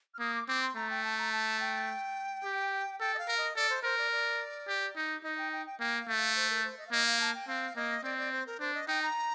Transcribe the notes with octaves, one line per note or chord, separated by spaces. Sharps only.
F6
A#3 D#6
D6
C4 D6
C6
A3 A#5
G5
A5
A#5
A5
G5
G4
A4 G5
D#5
F5
A#4
D#5
A4 D5
C5
A#4 C5
D5
D5
G4
D#4
D#4 D#5
G5
G5
G5
A#3 G5
F5
A3
F5
C5
A#4
C5
D#5
F5
A#3 D#5
F5
A5
G5
C4 F5
A#3 D#5
C4 D5
D5
C5
A#4
D4 C5
D#5
D#4 G5
A#5